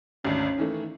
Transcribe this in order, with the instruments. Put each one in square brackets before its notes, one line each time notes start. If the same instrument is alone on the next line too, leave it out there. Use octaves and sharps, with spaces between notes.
[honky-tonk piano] G#1 D2 D4 [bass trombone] C#4
[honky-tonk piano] D#3 E3 A3